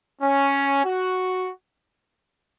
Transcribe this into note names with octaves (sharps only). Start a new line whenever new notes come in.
C#4
F#4